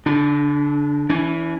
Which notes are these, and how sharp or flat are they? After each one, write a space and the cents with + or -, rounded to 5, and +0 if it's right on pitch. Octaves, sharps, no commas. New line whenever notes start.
D3 -35 D4 +0
E3 +0 C#4 +45